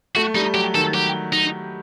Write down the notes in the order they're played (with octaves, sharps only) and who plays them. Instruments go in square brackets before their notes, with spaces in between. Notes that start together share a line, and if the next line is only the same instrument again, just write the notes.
[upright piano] A3 [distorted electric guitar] F#4
[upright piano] G3 [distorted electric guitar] D#4
[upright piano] F#3 [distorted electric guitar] G4
[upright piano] D#3 [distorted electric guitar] A4
[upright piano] F#3 [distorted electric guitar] G4
[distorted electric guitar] D#4